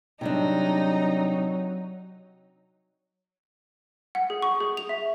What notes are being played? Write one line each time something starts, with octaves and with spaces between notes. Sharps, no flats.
C3 F#3 G3 D4 D#4
F#5
G#4
C#6
G#4
F7
E5